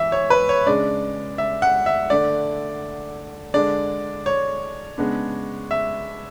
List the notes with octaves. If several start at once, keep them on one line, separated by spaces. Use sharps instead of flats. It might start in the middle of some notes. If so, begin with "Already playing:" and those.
Already playing: E3 E5
C#5
B4
C#5
C#3 G#3 D4 D5
E5
F#5
E5
D3 A3 D4 D5
D3 G#3 D4 D5
C#5
C#3 G#3 B3 D4
E5